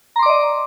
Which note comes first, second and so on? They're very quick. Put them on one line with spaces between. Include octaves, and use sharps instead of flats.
A#5 C6 D6 D5 D#5